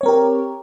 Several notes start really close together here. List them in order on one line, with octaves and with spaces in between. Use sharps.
C#5 C4 A#4 G4